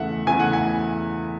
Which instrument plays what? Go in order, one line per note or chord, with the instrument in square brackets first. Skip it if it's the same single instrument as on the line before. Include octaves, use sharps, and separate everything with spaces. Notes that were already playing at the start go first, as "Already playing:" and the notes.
Already playing: [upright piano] E2 C#3 E3 A3 [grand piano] E5 F#5
[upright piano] E2 C#3 E3 A3 [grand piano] G#5
[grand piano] F#5
G#5